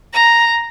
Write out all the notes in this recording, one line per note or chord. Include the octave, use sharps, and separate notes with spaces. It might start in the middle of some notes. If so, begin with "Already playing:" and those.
A#5